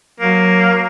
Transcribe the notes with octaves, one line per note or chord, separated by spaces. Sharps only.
F#3 A#3